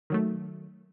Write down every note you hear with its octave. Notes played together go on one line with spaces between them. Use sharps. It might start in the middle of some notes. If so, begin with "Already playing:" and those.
D#3 F#3 A3